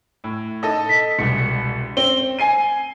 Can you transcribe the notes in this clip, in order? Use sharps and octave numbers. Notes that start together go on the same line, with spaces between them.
A2
D#4 A4 D#5
B6
E1 C2 C#7
C4 G7
G#5 C7 D#7